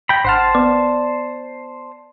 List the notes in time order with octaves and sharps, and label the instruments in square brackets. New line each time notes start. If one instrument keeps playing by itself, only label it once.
[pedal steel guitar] G5 B5 [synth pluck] A#6
[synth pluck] G#1 F#5 F6 [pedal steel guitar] C5 A5
[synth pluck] B3 D5